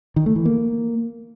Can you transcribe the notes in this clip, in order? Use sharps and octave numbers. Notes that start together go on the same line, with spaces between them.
D#3
A3
E3
A#3